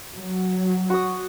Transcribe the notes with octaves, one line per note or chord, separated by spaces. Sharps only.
F#3
F#4 D#6